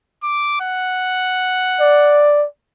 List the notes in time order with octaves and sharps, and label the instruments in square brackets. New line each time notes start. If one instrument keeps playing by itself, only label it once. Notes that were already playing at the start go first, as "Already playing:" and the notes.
[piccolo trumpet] D6
F#5
[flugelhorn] D5